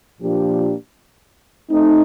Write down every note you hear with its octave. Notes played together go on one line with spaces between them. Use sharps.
A#2 F3 A#3 D4 G4
A3 C4 D#4